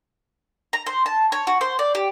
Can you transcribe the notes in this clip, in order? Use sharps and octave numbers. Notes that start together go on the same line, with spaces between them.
A#5
C5
A5
C#5
F#4
C5
D5
G4